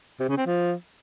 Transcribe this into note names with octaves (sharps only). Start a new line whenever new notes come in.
C3
C#3
C4
F3